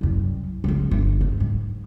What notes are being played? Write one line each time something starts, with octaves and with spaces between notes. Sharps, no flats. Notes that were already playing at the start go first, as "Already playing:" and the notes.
C2 F#2
C#2 F3
G1
F#2
G#2